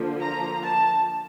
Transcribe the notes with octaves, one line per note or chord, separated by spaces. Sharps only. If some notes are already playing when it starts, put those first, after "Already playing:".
Already playing: D3 F3 A#3
A#5
A5